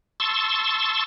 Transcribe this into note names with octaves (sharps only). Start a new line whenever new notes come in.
A5 C6 C#6 E6 A6